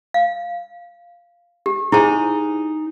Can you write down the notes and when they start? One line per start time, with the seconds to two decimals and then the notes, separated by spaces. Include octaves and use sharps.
0.14 F5
1.66 G4
1.92 D#4 E4 G#4 C5 G#5